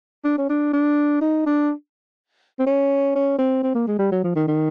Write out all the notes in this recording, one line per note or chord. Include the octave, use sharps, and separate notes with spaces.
D4
C#4
D4
D4
D#4
D4
C4
C#4
C#4
C4
C4
A#3
G#3
G3
F#3
F3
D#3
D#3